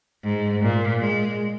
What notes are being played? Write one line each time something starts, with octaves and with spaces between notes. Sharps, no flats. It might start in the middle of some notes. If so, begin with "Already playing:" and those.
G#2
A#2
G#3